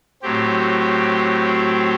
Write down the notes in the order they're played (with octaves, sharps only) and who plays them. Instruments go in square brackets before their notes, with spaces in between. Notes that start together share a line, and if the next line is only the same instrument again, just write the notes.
[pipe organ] A2 F#3 C4 G4